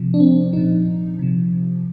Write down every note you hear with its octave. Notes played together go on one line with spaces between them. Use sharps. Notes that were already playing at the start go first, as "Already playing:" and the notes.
Already playing: C3 F3
D4
C4
A#2 F3 D#4
C3 F3